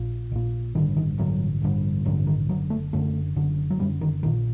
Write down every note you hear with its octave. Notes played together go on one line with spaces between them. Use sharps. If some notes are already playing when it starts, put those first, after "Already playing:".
Already playing: A#1 A#2
A#1 A#2
A1 G2 D3 D#3
D#3
A1 G2 D3 F#3
A1 G2 D3
A1 G2 D3 F#3
D#3
F#1 F#2 D3 F#3
A3
F#1 F#2 D3 A3
F#1 F#2 D3
F#3
F#1 F#2 D3 G3
D#3
A#1 A#2 D#3